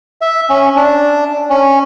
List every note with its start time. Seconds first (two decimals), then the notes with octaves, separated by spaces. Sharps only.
0.21 E5
0.50 C#4
0.76 D4
1.50 C#4